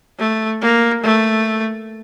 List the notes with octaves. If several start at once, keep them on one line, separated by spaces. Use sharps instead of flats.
A3
A#3
A3